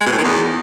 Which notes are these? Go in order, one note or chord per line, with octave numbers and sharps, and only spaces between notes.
G#3
B2
A2
D#3
E2